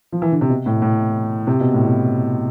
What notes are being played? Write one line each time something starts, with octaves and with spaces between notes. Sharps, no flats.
F3
E3
D3
C3
B2
A2
A2
C3
B2
A2
B2